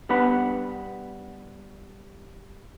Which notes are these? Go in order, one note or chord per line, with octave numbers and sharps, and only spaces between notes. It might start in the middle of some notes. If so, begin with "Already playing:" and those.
G3 B3 D4 B4 F#5 B5